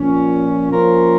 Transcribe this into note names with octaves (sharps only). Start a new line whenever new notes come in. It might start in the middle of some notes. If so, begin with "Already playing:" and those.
Already playing: A#2 F3 C#4
F3 A#3 C#4 F4 A#4